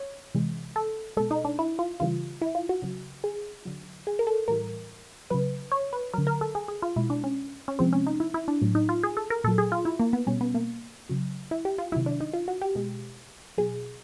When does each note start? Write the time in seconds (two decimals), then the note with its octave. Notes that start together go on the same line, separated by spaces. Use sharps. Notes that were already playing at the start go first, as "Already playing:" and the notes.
Already playing: C#5
0.35 C3 E3 G#3
0.76 A4
1.17 B2 G#3 A4
1.31 D#4
1.45 D4
1.59 E4
1.79 F4
2.00 C#3 E3 G3 F4
2.41 E4
2.55 F4
2.69 F#4
2.82 C#3 F#3
3.24 G#4
3.65 D3 F#3
4.07 G#4
4.19 A#4
4.27 A4
4.48 A2 E3 G3 A#4
5.30 C#3 F#3 B4
5.71 C#5
5.93 B4
6.13 D3 F#3 A#4
6.27 A#4
6.41 A4
6.55 G#4
6.68 G#4
6.82 F4
6.96 B2 G#3 E4
7.10 D4
7.24 C#4
7.68 C#4
7.79 C3 F3 G#3 C4
7.93 C#4
8.07 D#4
8.20 E4
8.34 E4
8.48 D4
8.62 A2 F#3
8.75 D#4
8.89 F4
9.03 G#4
9.17 A4
9.30 A#4
9.44 A#2 F#3 A4
9.58 G#4
9.72 F4
9.85 E4
9.99 A#3
10.13 B3
10.27 B2 G3 C#4
10.41 B3
10.54 A#3
11.09 C#3 F#3
11.51 E4
11.65 G4
11.78 F4
11.92 C3 D#3 F#3 E4
12.06 D4
12.20 D#4
12.34 F4
12.48 F#4
12.61 G4
12.75 B2 G#3
13.58 B2 F#3 G#4